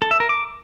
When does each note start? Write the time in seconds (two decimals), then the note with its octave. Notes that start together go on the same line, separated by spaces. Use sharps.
0.02 A4
0.11 E5
0.20 A#4
0.29 D6